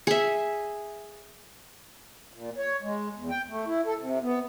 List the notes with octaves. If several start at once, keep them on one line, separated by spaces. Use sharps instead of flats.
G#4 E5
A#2
C#5
G#3
E2
G5
A3
E4
A4
C3
B3